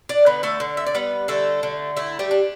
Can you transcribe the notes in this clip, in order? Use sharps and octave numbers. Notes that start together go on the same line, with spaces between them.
D4 D5
D3 B3 B4
A3 A4
D3
E5
D5
G3 B3 B4
D3 A3 A4
D3
A3 E4
G3 G4
D4